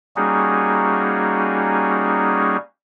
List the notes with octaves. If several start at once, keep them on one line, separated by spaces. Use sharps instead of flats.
G3 A#3 C#4 D#4 F#4 G#4